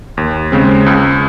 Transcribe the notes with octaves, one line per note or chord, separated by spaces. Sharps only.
D#2
C#3 G#3 C4
C#2